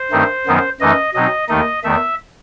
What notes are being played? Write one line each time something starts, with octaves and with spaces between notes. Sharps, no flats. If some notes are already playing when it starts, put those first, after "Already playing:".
Already playing: C5
G2 D#3 A3 C4 D#4
F#2 D#3 F#3 B3 D#4
F#2 E3 A3 D#4 D#5
B2 F#3 C4 D#4 D#5
D#2 D#3 A3 D#4 D#5
E2 D#3 A3 E5